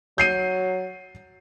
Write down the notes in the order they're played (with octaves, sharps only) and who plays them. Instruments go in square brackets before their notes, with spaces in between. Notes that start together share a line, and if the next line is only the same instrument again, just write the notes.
[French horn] F#3 [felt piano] G6 C7 D#7